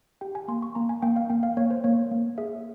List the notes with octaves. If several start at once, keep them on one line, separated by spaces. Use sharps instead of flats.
G4 G5
G#5
A#3 C6
C#6
A#3 A#5
G#5
A#3 G5
F5
A#3 G5
F5
A#3 C#5
C5
A#3 C#5
A#3
G#4 E5